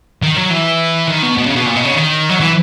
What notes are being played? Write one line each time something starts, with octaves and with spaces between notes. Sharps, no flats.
D#3
F#3
E3
D#3
B2
B2
C#3
B2
A#2
B2
C#3
D#3
F#3
E3